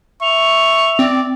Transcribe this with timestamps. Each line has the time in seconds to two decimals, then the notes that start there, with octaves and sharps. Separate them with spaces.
0.23 E5 C#6 F7
0.99 C4 D5